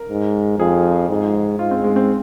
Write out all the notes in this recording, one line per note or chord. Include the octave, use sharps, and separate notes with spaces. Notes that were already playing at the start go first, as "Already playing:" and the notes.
Already playing: A#4
G#2
F2 G#4
G#2
G#2 F4
C4
G#3
C4